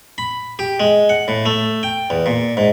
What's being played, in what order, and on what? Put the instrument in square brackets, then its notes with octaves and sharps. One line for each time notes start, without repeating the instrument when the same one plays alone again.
[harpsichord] B5
G4
G#3
F#5
A2
A3
G5
E2
A#2
G#2